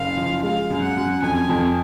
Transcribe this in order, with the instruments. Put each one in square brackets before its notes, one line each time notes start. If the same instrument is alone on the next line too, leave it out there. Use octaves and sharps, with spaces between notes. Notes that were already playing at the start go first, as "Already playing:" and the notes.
Already playing: [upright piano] F#1 [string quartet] F5
[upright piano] F3
[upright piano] G#3 [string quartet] F5
[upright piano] F#2
[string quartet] F#5
[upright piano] F#2
[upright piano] F2 [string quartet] G#5
[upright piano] F2